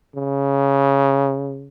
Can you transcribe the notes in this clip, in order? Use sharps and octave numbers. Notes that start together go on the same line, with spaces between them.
C#3